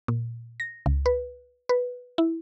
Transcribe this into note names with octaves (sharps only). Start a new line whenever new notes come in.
A#2
A#6
C#2
B4
B4
E4